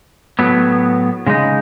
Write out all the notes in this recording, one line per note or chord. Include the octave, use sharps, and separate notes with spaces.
A2 F#3 B3
C#3 G#3 D#4